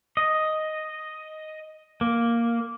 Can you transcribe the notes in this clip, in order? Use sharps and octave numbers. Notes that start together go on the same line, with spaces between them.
D#5
A#3